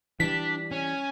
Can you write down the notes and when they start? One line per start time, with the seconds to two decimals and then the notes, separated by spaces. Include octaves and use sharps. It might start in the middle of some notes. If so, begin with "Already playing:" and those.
0.20 E3 G3 D4 B6
0.72 C#4 G#5